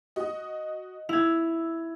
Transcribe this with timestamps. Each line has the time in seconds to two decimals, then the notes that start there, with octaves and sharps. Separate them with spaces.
0.16 F#4 D#5
1.09 E4 G#6 F7